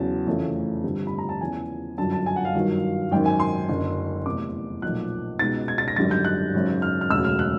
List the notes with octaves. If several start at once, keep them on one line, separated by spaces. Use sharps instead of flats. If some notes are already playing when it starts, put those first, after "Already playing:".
Already playing: E2 C#3 F#3 A5
F1 F2 C#3 E3 A3
G1 F2 D3 G3 C4
B5
A#5
A5
E2 C#3 F3 G#5
G1 F#2 D3 F#3 A5
A5
G#5
F#5
F5
G1 G2 D#3 F#3
G#1 F#2 D#3 G5
G#5
C6
F#1 F#2 D3
F1 E2 C3 D6
B1 A#2 F3 F#6
C#2 B2 G#3 B3 D#4 A6
G#6
A6
A#6
G#1 F#2 D3 G3 A6
G6
F#6
G#1 F#2 C#3
F6
F6
E1 D2 C#3 F#3 E6
F6
F#6